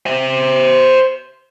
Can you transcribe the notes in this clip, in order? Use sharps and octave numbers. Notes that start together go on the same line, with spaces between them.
C5 E5